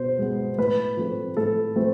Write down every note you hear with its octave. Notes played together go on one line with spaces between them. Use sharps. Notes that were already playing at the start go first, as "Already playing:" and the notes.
Already playing: B2 B3 C5
G#3 B3
A2 B4
F3 A3 C4
A2 A4
F3 A3 C4